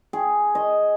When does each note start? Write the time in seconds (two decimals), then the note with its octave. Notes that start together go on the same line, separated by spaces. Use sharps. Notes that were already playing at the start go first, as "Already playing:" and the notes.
0.13 G#4
0.55 D#5